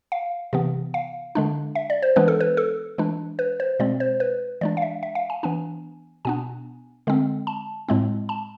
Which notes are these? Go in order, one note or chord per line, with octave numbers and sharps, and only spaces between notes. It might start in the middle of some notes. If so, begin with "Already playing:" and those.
F5
C3 E3 B3
F5
D3 G#3 D4
E5
D5
C5
E3 G#3 B3 D4 B4
A4
B4
A4
E3 G#3 D4
B4
C5
B2 G#3 C4 D5
C5
B4
E3 G#3 D4 D5
F5
E5
E5
F5
G#5
E3 B3 D4 G#5
B2 B3 D4 G#5
D3 G#3 C4
A5
A2 G#3 C4
A5